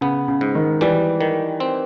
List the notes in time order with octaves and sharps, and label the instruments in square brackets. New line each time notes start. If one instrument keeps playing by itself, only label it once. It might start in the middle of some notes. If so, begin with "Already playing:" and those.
[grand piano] C#3 [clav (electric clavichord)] B3
[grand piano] C#3
[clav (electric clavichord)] G#2
[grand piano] D#3
[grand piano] E3 [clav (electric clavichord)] G3
[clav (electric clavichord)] D#3
C4